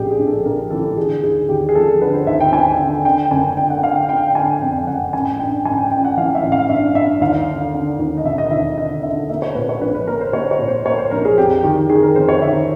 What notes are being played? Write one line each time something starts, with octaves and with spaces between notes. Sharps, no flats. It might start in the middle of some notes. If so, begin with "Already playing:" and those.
Already playing: A#1 A2 G4 G#4
G#4
A#1
A4
A#1 A#4
E3 A4
D3 G#4
D#2 G#4
D#2 G4
G#4
F3 A4
D3 B4
C5
D#2 E5
G5
D#2 G#5
D3
D3 G5
F#1 G#5
D3 G5
F#5
D3 F5
G5
D3 G5
D3 G#5
F2 G5
F#1 F#5
A1 G#5
G2 G5
A1 G#5
G5
A1 G5
F#5
E3 F5
E5
A1
F5
G2 E5
G2 E5
D#2 F5
D3
D3
D#2
D#5
E1 E5
D#5
D#2 E5
D3 D#5
D3 E5
A#3 E5
C#5
A#2 B4
C#5
A#1 B4
B4
A#3 A#4
C5
A#3 C#5
C#5
A#2
C5
A#3 C#5
C5
A#1 A#4
G#4
F2 G4
D#3 G4
D#3 G#4
A#4
F2 C5
C#5
D#3 E5